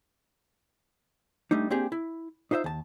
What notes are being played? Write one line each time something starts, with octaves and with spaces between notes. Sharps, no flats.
G3 A3 D4 D#4
A#3 C4 D4 G4 G#4
E4
D#4 F4 C5 D#5 E5
D#2 A5